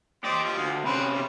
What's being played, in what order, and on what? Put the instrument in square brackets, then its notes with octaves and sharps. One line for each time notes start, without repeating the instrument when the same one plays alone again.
[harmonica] C4 D5 [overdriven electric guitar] G4 D#5
[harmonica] F3
[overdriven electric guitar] D2
[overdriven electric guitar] C3 C#4 [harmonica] C4 B4
[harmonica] G3